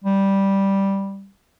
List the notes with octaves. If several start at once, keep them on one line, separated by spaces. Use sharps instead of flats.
G3